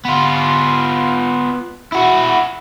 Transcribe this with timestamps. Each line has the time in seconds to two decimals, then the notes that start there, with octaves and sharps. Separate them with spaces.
0.05 B3 F4
1.92 E4 F#4